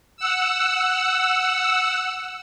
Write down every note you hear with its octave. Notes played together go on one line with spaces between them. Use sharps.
F#5 E6